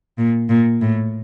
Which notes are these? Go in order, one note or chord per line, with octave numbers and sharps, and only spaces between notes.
A#2
A#2
A2